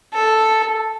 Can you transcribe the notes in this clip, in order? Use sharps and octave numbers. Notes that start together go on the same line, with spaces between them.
A4